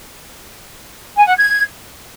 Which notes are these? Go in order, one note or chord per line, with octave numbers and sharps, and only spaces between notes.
G#5
F#5
G#6